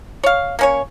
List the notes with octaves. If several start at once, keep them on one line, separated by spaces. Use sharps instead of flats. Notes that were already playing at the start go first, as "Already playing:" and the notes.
C#5 F5
A#3 C#4 C#5